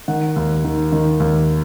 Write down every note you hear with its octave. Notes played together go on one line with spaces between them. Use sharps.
D#3 F#5
D#2
D#3
D#3
D#2